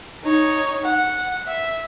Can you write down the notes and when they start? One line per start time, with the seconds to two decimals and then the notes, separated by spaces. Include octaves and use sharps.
0.24 D#4 C#5
0.84 F#5
1.47 E5